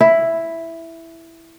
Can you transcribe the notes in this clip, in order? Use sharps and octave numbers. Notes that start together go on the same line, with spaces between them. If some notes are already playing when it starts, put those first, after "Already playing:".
E4